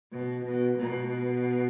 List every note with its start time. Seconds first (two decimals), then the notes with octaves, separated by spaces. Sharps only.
0.13 B2
0.45 B2
0.79 B2